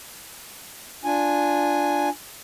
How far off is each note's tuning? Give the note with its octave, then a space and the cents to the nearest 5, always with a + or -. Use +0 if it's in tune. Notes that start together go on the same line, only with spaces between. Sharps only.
D4 +0 F4 +0 G#5 +0